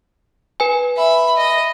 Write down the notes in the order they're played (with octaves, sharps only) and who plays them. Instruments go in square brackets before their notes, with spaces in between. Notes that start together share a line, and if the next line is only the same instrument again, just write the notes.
[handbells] B4 G#5
[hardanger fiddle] E5 B5
D#5